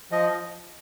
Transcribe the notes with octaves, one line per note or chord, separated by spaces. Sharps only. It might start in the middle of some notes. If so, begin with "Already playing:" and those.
F3 D#5